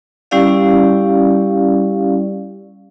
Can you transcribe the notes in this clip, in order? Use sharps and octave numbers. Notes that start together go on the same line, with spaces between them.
G3 C#4 E4 G4 D5 F5